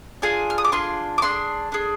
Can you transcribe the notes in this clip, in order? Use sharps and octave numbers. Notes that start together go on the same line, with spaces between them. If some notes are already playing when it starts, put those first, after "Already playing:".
D4 F4 G#4 G#5
F6
D#6
D6
D4 F4 G#4 C6
D6
D4 G#4 C6
D4 G#4